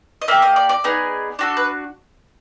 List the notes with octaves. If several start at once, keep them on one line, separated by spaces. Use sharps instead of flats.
D#5
A#3 D4 G4 E5
D#5
D5
D5
B3 D#4 G#4
D4 F#4 A4
B4